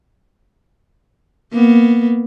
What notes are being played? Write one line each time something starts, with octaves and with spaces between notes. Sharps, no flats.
A#3 B3